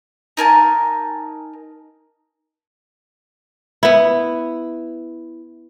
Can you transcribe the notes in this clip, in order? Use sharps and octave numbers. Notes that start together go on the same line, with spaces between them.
D#4 A#4 G#5 A5
B3 E4